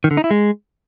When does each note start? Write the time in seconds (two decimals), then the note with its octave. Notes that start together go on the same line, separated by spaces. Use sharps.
0.04 D#3
0.11 D3
0.17 D#4
0.24 E4
0.31 G#3